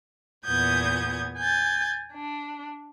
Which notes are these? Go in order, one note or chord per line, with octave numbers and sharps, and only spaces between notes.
E2 A#2 B3 D#6 G6 G#6
G#5 G6 A6
D4